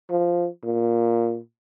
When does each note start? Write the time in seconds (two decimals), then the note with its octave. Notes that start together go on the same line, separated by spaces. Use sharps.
0.10 F3
0.64 A#2